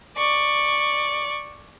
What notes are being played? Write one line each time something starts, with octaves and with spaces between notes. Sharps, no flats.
D5 C#6